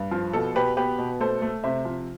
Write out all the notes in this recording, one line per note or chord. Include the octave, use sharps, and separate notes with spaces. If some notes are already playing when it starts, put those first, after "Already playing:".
Already playing: G2
F3
B2 A4
B2 G4 B4
B3 G4 B4
B2
A3 A4 C5
A3
C3 C5 E5
F3